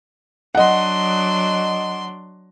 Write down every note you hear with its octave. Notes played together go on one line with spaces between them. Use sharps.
F#3 D4 D#5 F#5 C6